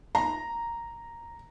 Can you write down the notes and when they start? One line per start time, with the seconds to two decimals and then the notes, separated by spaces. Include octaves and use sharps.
0.15 A#5